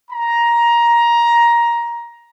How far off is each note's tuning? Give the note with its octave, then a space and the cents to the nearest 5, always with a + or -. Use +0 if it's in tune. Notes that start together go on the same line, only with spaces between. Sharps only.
A#5 +15